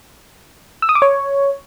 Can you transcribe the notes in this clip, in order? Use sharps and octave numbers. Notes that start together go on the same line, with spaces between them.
E6
D#6
D6
C#5